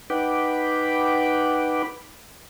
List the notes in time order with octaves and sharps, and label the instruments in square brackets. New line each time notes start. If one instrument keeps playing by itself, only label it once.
[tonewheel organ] D#4 B4 F#5 G5 B5 D6